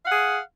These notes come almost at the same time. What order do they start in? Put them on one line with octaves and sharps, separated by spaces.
F5 F#5 G#4